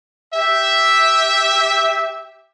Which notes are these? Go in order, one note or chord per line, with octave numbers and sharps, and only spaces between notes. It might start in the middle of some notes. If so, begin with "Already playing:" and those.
G4 E5